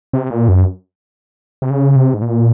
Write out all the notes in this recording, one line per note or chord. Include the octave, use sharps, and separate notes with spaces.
C3
A#2
F#2
C3
C#3
C3
G#2
A#2